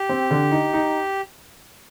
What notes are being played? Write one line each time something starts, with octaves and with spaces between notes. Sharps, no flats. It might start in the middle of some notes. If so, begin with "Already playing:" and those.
Already playing: G4
C4
D3
D#4
D#4